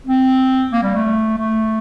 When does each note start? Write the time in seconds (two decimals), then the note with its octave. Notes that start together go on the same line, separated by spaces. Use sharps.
0.07 C4
0.73 A#3
0.83 G3
0.95 A3
1.38 A3